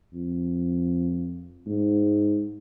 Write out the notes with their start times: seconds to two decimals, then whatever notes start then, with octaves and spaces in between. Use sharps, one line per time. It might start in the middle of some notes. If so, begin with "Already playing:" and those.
0.14 F2
1.67 G#2